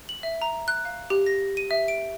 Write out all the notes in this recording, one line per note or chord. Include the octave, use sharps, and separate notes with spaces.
F#7
E5
A#5
F#6
F5
G4
A#6
D#7
E5
D7